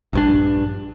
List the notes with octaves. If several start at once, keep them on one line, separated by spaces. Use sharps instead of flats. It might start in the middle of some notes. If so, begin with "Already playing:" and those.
A#1 G2 D4